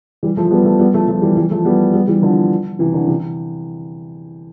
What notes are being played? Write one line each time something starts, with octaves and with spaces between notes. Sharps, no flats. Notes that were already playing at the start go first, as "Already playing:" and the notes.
E3 G3
F3 A3
G3 B3
F3 A3
G3 B3
F3 A3
F3 A3
E3 G3
E3 G3
F3 A3
G3 B3
G3 B3
E3 G3
D3 F3
C3 E3
D3
C3 E3